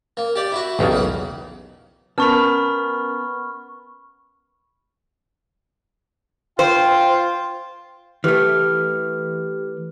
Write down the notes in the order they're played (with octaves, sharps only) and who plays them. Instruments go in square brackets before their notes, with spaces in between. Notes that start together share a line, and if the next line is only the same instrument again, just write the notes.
[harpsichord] A#3
G4 D5
E4 F#4
[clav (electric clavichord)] B1 E2 C#3 [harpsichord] G3
[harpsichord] A#3 F#5
[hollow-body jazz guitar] B3 A5 [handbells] C#4 A#4 [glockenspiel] B5 C#6 F6
[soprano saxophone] F4 [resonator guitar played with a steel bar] C5 [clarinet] G5
[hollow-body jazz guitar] E3 A3 [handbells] G4 B4 F6